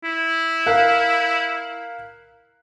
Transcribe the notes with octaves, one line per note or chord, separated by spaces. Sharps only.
E4
A#4 F5 F#6